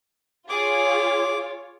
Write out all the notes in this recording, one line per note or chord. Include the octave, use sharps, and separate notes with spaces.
F4 G#4 C#5 D6